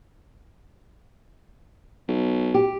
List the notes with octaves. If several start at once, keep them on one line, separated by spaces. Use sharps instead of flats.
B1
G4